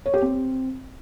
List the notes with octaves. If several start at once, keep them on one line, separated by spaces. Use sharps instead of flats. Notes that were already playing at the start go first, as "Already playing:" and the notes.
C#5
G4
C4